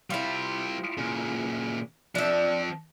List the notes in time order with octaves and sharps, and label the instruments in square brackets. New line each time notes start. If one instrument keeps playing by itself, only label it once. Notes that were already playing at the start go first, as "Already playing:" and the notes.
[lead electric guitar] G3 C5 [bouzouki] E4 F4
[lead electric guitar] A#2 C#3
[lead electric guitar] F3 C4 [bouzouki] D4 E5